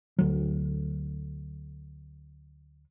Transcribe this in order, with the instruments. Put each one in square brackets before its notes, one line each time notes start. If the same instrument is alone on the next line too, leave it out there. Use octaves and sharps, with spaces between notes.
[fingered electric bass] D2 F#3